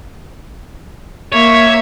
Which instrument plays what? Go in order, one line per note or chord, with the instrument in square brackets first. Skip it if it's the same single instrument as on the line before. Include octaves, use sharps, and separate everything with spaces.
[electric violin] A#3 E5 [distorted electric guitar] C#5